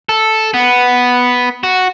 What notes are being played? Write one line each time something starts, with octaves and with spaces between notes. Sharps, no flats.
A4
B3
F#4